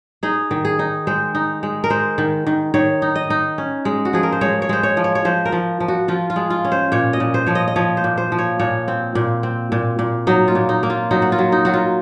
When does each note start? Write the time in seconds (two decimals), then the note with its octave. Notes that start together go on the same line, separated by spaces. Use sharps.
0.23 D#4 G#4
0.51 D#3
0.65 G#4
0.79 D#4
1.07 G#3 C5
1.35 D#4
1.63 G#3
1.84 A#4
1.90 G#3 C5
2.18 D#3
2.47 D#3
2.74 D#3 C#5
3.02 D#4
3.15 D#5
3.30 D#4
3.58 C#4
3.85 G#3
4.05 F#4
4.13 F3 G#4
4.23 A#4
4.32 C5
4.41 G#3 C#5
4.62 C#5
4.69 G#3 C5
4.83 C#5
4.97 F3
5.04 C#5
5.15 C#5
5.25 F3 C5
5.45 A#4
5.52 F3
5.80 F3
5.88 F#4
6.08 F3 F4
6.30 F4
6.36 G#3
6.50 F4
6.65 C#4
6.72 C5
6.92 A#2 C#5
7.13 D#5
7.20 A#2
7.34 C5
7.47 F3 C#5
7.55 D#5
7.68 D#5
7.76 F3 C#5
7.97 C5
8.04 A#2
8.18 C5
8.32 F3
8.39 C#5
8.59 A#2 C#5
8.88 C4
9.15 A#2
9.43 C4
9.72 A#2
9.99 A#2
10.27 F#3 D#4
10.48 F4
10.55 A#2
10.69 D#4
10.83 A#3
10.90 F4
11.11 F#3 D#4
11.22 F#4
11.32 F4
11.38 F#3
11.52 D#4
11.65 F#3 F#4
11.74 F4